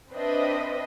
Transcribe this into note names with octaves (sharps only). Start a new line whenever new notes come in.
C4 D4 B4 C5 D#5 E5